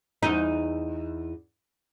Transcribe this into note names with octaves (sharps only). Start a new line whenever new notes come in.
E2 D#4